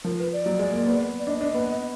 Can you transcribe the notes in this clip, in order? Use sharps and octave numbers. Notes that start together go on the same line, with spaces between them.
F3 A#4
B4
D5
F#3
G#3
A#3
B3
D5
D4 D#5
D4
B3